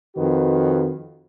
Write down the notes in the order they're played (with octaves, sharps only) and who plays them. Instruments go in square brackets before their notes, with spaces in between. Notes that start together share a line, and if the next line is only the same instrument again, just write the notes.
[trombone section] F2 D#3 F#4 B4